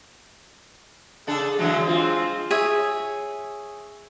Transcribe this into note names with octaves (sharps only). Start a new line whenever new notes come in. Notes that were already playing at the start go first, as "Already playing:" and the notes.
C#3 D4 G#4 A4
D3 E3 F#3 G#3
G#3 C4 F4
G#4 C#5 E5